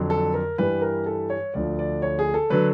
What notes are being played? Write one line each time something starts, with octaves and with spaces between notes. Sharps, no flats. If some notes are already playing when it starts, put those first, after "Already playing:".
Already playing: F2 D3 F#3
A4
A#4
G2 E3 G3 B4
A#4
A4
C#5
D2 D3 F3 D5
D5
C#5
G#4
A4
D3 F#3 B4